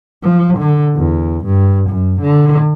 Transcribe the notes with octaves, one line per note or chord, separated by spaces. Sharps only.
F3
D3
E2
G2
F#2
D3